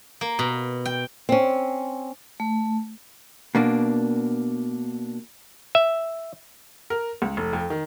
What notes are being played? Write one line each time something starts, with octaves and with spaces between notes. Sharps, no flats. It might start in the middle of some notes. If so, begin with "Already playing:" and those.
A#3
B2
G5
C4 C#4
A3
B2 A#3 D4
E5
A#4
C#2
F1
F2
D#3